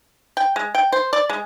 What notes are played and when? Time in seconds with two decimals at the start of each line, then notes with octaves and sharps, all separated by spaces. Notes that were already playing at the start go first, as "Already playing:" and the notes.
0.37 G5
0.56 G#3
0.75 G5
0.92 C5
1.13 D5
1.30 G#3